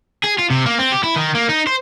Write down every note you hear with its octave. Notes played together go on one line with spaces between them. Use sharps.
G#4
F4
C3
A#3
C4
G4
E4
D#3
A#3
D#4
C5